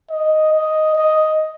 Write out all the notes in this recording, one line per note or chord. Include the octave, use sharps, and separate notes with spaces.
D#5
D#5
D#5